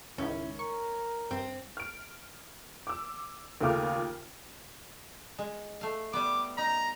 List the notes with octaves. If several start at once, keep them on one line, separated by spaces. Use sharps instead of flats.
C#2 G#2 D#3 C#4 E4
A#4 C#6
G2 C4
F6 D7
D6 E6
D#2 C#3 A3 F4 D6 F6
G#3
A3 F5
G3 B3 D6
D#4 A#5